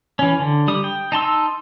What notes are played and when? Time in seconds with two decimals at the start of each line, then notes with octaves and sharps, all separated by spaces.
0.19 E3 C#4
0.39 D3
0.68 G3 D#6
0.84 G5
1.12 D#4 A5 C6 E6